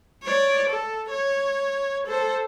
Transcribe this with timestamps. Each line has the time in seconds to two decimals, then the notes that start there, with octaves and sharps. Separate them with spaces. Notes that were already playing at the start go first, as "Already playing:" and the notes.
0.23 C#5 D5
0.68 A4
1.11 C#5
2.07 A4 C5